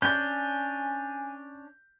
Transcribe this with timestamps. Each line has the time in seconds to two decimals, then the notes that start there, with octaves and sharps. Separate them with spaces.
0.02 C#4 D4 G#5 G6